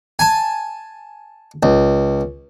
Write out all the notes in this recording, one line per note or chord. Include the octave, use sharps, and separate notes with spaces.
G#5 A5
C#2